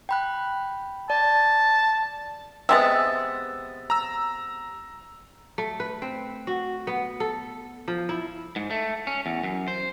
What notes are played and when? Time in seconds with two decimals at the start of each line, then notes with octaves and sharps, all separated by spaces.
0.09 G5 B5 F#6
1.10 D5 A5
2.69 C3 G#3 B3 E6 A6
3.90 A#5 E6
5.58 A3
5.80 B4
6.02 C4
6.47 F#4
6.87 B3
7.20 A4
7.88 F3
8.09 E4
8.56 G#2
8.71 A3
9.07 C#4
9.26 E2
9.44 F#2
9.68 C5